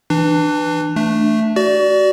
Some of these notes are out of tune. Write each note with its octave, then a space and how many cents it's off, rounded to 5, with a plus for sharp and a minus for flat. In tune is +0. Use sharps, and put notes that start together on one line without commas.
E3 +0 D4 +25
A3 +0 D4 +0
F#4 +30 D5 -10